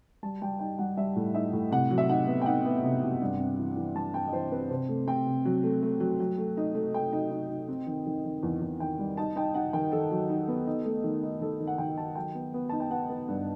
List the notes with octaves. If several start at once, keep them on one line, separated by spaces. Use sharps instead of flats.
G3 A5
G3 G5
D#4 G5
G3 F#5
G3 E5
A2
D#4 E5
A2
C3 F#5
F#3
E5
D#4 F#5
B3
G5
D#4 F#5
B3
C3
C3
G2
C4
E3
E3
G2 A5
C4 G5
D#5
E3 C5
C4 B4
C3 C5
A3
C4 G5
C3
F#3
A3
A3
F#3
F#3
A3
D#4
A3
A3 G5
D#4
D#4
D#4
C4
D#3
D#3
D#3
E2
E2
D#3 G5
G3
D#4 A5
D#4 G5
D#4 F#5
D#3 G5
D#3 A4
F#3
D#4
B3
D#4
A3
D#3
D#4
D#3 A4
D#3
F#5
D#3 G5
D#3 A5
F#3 G5
B3
B3
D#4 A5
G5
B3 F#5
B3
G2